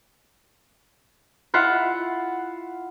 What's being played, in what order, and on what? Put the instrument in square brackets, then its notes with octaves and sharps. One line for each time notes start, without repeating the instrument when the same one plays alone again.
[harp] E4 F4 F#5